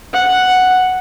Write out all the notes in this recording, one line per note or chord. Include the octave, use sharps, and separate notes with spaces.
F#5